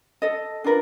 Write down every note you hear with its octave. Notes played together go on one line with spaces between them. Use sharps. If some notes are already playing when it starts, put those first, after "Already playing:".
A4 D#5
D4 F4 A#4 B4